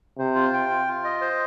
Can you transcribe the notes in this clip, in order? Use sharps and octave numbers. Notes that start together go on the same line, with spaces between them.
C3 C5
F4
G5
F4
F4
D#5
C5